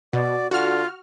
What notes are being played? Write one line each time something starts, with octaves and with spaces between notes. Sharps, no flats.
B2 F#4 D5
D3 F4 F#4 F6